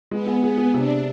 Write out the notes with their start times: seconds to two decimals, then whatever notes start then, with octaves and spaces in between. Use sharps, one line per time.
0.11 G#3 B3
0.27 G#4
0.42 B3 G#4
0.57 G#4
0.74 C3 D4